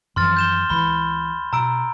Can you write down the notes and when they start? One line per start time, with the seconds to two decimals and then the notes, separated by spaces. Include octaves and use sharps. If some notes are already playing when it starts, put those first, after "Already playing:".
0.16 F#2 E3 F3 C6 F6 A6
0.37 G6 E7 G7
0.70 C#2 E3 B5 G7
1.53 B2 A#5 E6 D7